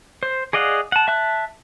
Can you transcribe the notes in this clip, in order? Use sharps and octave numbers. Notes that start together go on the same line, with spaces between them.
C5
G#4 D5 D#5 F5 F#5
F#5 A5
E5 A5 F#6